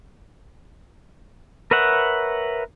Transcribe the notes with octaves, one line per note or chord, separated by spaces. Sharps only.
A#4 B4 C#5 E5 F#5